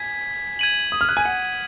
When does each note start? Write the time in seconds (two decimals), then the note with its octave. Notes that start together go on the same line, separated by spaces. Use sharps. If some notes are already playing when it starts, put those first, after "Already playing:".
Already playing: G#5 G#6 B6
0.59 G#6 D#7 F#7
0.92 D#6
1.01 F6
1.09 F#6
1.17 G#5
1.25 F#5